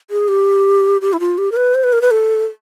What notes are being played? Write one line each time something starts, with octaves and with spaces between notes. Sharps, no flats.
G#4
G4
G4
E4
F4
G4
A#4
B4
C5
B4
A#4
B4
A4